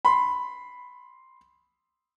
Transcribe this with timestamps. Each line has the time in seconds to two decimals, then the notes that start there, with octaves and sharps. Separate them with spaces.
0.05 B5 C6